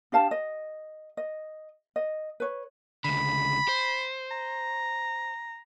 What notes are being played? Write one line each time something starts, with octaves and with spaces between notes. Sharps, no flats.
D4 G4 F5 A5
D#5
D#5
D#5
B4 C#5
C#2 D3 B5
C5
A#5